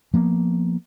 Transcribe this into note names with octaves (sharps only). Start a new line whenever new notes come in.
F3 A#3 B3